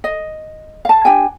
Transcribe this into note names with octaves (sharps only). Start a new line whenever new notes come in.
D#5
F5 A5
D4 G4 G5 G#5